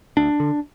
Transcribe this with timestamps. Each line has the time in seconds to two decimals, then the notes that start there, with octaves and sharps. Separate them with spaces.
0.17 D2 D4
0.40 D3